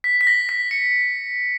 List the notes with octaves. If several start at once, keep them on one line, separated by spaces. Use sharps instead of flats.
B6
B6
A#6
B6
C#7